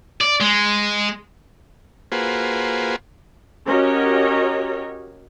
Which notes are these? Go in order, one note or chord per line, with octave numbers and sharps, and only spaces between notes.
D5
G#3
A#3 F4 F#4 G#4 B4 C5
C#4 F#4 G4 A#4 C#5 D#5